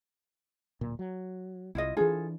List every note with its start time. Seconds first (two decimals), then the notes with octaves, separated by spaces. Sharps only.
0.81 D1 A#2
0.99 F#3
1.75 C2 E4 F4 D#5
1.97 E3 D4 F4 G#4 A4